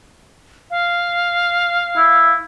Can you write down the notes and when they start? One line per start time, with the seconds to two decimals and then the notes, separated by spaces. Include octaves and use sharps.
0.70 F5
1.97 E4